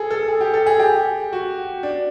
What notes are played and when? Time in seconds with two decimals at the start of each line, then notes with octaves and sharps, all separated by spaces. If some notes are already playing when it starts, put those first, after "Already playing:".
Already playing: G#4 A4
0.11 A4
0.28 G#4
0.41 G4
0.54 A4
0.67 G#4
0.79 G4
1.33 F#4
1.83 D4